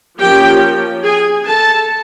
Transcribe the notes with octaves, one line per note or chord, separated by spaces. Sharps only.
F3 A#3 C#4 G4 G5
G#4 G#5
A4 A5